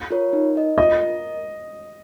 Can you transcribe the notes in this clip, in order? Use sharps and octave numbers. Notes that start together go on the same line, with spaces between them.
F4 A#4 C#5
D#4
A#4 D#5
F4 D#5
A#4 D#5